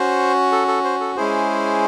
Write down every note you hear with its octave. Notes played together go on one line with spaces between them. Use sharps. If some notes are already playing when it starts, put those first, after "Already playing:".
Already playing: C#4 F#4 C5
A4
A4
C5
A4
G#3 C#4 E4 G#4 C5